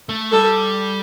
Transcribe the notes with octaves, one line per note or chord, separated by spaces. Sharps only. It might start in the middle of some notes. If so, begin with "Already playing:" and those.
A3
G3 A4